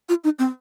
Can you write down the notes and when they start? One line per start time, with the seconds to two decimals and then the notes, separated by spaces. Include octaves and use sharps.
0.09 F4
0.24 D#4
0.39 C4